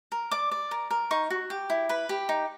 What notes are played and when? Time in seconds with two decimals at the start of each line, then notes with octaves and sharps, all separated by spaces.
0.12 A#4
0.31 D5 D6
0.51 D5
0.71 A#4
0.90 A#4
1.11 D#4 C#6
1.30 F#4
1.50 G4
1.70 E4
1.89 B4 B5
2.09 G4
2.29 D#4